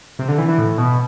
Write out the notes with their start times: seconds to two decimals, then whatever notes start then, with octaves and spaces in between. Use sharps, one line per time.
0.19 C3
0.29 D3
0.38 E3
0.48 E3
0.58 A2
0.78 B2